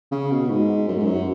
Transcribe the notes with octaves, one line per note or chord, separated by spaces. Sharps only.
C#3
B2
G#2
F#2
G#2
F#2